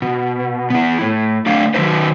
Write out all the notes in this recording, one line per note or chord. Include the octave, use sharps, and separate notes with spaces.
B2
B3 E4
A2
A3 D4 D5 F5
D#3 E3 F#3 D#4 B4 C5